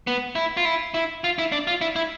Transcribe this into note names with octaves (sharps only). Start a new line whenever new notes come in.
B3
E4
F4
E4
E4
F4
E4
D4
F4
E4
E4